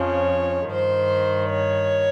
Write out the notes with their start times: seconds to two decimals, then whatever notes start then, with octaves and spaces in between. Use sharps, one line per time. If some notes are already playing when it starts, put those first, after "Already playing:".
Already playing: F2 C#3 F3 C#5
0.72 G2 D#3 C5
1.49 C#5